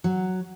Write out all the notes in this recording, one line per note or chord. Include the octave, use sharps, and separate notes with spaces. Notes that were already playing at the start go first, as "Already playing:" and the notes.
F#3